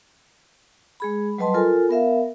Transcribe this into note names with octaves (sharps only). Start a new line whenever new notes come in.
G#3 G#4 B5
F#3 G3 B4 D#5 A5 C6
F4 A4 A#4 G#5
B3 A#4 E5 F5